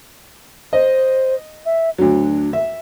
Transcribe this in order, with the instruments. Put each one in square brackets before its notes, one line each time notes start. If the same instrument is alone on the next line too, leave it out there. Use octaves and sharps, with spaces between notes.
[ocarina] C5 [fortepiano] D#5
[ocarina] E5
[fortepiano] D2 F#3 [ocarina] D4
[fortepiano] E5